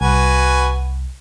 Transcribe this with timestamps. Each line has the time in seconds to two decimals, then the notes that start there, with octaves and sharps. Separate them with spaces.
0.01 C2 F#4 B4 G#5